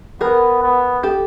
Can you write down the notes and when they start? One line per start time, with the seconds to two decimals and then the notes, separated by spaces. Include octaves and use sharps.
0.21 B3 G#4 A#4
0.62 B3
1.03 G4 A4